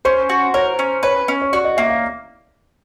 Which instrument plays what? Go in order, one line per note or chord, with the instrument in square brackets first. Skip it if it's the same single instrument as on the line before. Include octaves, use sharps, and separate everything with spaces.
[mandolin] C#4 [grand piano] C5
[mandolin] F#4
[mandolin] A#4 [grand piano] C#5
[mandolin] C#4
[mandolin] B4 [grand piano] C#5
[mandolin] C#4
[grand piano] C#5
[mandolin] F#4 [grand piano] D5
[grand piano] D#5
[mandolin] A#3 [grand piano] E5
[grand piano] F5